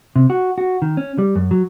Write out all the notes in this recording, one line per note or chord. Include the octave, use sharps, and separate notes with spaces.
C3
F#4
F#4
D#3
C#4
G3
F#2
F#3